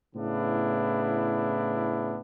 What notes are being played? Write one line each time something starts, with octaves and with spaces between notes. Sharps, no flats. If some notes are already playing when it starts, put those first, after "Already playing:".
A2 C#3 B3 D4 E4